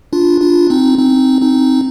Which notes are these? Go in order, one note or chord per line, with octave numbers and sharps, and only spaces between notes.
D4 F4
D4 F4
C4 D#4
C4 D#4
C4 D#4